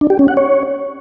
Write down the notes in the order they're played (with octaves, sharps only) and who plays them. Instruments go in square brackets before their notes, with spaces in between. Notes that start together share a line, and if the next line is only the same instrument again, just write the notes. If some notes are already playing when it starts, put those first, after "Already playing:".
[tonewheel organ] D4
G4
C#4
F#5
C#5